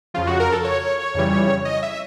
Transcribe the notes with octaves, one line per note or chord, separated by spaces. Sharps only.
F2 C#3 F3 F4
F#4
A#4
A4
C#5
F2 C#3 E3 G3
D#5
E5